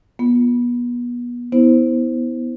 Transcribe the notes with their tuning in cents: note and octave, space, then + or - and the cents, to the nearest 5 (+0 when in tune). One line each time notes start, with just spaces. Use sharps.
B3 -30 F4 +0
B3 +0 E4 -30 C5 +0